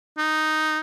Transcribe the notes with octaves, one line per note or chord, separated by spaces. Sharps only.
D#4